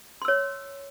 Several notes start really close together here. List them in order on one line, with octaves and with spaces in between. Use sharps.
C6 E6 C#5